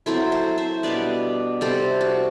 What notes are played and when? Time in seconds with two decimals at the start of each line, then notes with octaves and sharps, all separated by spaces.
0.06 F#3 C4 E4 A4 C5
0.32 A4 C5
0.58 C5 E5
0.83 B2 G3 B3 D4 B4 D5
1.61 C3 G3 C4 A4 C5
2.01 F#4